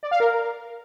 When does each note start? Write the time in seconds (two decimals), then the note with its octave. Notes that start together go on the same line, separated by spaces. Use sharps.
0.03 D5
0.11 F5
0.20 A#4